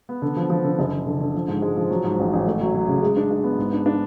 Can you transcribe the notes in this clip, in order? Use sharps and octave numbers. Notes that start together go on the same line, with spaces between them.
B3
D3
F3
F3
D3
F#1
D3
D3
D3
F3
G#2
G#3
F3
F#3
G#2
A1
A1
A3
F#3
F#3
C#3
G#3
D4
D4
B3
G#2
D4
D4